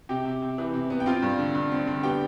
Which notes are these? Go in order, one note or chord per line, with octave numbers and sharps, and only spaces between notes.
C3 G4 G5
C3
C3
E3
C3
B3
G5
C4 F4 F5
G2
D3
G2
C4
D3
B3 G4 G5